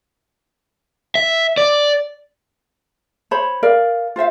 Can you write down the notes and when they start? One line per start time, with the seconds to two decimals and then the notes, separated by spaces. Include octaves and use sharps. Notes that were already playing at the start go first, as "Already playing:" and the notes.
1.15 E5
1.57 D5
3.31 C5 C#5 B5
3.63 A#4 D5 F5
4.16 F4 C5 E5 F5